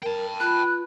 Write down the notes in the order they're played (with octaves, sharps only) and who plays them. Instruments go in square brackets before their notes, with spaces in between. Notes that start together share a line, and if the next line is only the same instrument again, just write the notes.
[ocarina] A#4 [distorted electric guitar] G5 A5
[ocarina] F4 [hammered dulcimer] B4 [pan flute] F#6